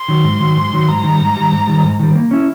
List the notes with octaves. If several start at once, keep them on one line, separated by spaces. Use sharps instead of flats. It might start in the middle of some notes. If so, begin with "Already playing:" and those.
Already playing: C6
D#3 F#3
G#2
D#3 F#3
G#2
D#3 F#3
G#2 A#5
D#3
G3
G#2
D#3 G3
G#2
D#3 G3
G#2
D#3 G3
A#3
C#4 E4